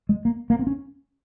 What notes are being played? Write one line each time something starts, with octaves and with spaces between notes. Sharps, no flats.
G#3
A#3
A#3
C4
C#4